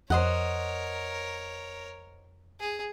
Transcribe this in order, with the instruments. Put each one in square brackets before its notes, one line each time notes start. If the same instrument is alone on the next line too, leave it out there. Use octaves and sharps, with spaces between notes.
[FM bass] F2 [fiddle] A#4 C#5 [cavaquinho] C5 D#5 F#5
[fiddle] G#4